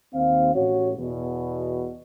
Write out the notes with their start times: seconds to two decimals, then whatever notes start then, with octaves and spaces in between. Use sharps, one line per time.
0.14 D#2 C4 F5
0.55 A1 A2 F#4 C#5
0.97 E2 B2